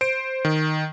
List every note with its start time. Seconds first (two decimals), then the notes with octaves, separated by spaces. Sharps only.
0.01 C5 D7
0.45 D#3